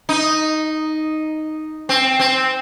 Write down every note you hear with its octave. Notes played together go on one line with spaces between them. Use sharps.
D#4
C4
C4